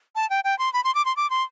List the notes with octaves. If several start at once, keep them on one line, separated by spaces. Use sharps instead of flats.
A5
G5
G5
C6
B5
C6
D6
C6
D6
C6